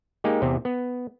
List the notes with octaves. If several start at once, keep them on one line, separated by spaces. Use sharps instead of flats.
G#3 A#3 D#4 G4
E2 C3 C4
B3